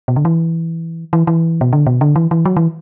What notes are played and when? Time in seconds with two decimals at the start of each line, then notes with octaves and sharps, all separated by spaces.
0.08 B2
0.16 D3
0.25 E3
1.13 E3
1.27 E3
1.61 B2
1.73 D3
1.87 B2
2.01 D3
2.16 E3
2.31 E3
2.45 F#3
2.57 E3